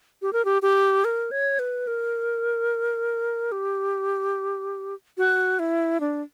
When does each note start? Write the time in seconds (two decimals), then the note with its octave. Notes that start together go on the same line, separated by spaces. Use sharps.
0.22 G4
0.33 A#4
0.45 G4
0.62 G4
1.05 A#4
1.31 C#5
1.59 B4
1.87 A#4
3.52 G4
5.18 F#4
5.59 E4
6.00 D4